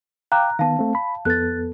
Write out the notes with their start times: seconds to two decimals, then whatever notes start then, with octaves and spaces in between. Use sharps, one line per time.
0.32 F5 G5 A#5 D6 F#6
0.59 D#3 B3 F5 A5
0.79 A3 C4
0.95 B5
1.25 F2 B3 A4 F#6 A6